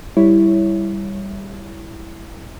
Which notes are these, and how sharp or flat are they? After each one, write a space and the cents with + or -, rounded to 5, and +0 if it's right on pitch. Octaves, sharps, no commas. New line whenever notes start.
G3 +5 E4 +0 C#5 +0